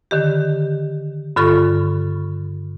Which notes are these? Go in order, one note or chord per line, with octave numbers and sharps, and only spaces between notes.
D3 D#3 G4
G2 D3 F4 A4 B5 C#6